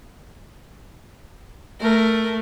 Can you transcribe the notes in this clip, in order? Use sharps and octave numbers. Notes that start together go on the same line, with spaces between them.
A3 A#4